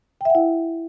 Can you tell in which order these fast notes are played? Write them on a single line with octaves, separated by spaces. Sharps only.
G5 E5 F#5 E4